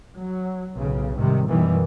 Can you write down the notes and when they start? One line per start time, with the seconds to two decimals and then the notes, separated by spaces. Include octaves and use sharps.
0.17 F#3
0.75 B1 A2 C#3
1.16 G#2 C3 D#3 G3
1.49 F#2 B2 D#3 E3 G3